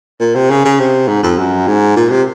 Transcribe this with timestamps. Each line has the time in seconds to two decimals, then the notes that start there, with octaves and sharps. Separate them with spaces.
0.20 A#2
0.35 C3
0.50 C#3
0.65 C#3
0.80 C3
1.08 G#2
1.23 F2
1.39 F#2
1.68 G#2
1.97 A#2
2.10 C3